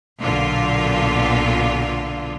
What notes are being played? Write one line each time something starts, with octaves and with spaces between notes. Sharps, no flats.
B1 A#2 D3 F4